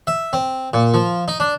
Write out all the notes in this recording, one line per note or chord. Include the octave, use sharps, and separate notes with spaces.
E5
C4
A#2
F3
D#4
D4